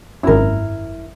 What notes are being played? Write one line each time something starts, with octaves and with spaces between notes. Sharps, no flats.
G#1 F#2 E4 A#4